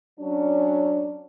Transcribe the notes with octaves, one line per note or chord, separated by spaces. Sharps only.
F#3 C#4 D4